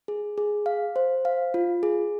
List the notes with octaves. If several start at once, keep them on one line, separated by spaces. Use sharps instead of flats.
G#4
G#4
F5
C5
F5
F4
G#4